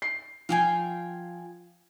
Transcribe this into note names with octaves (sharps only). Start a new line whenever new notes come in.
C7
F3 F5 G5 G#5